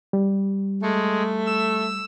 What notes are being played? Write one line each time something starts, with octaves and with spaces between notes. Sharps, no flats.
G3
G#3 A3
E6